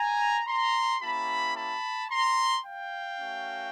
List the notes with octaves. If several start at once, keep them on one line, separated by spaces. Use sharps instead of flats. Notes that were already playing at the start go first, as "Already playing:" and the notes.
Already playing: G#5 A#5
A#5 C6
A#3 C#4 E4 G4 A5 B5
A5 B5
A#5 C6
F5 G5
A3 C#4 F#4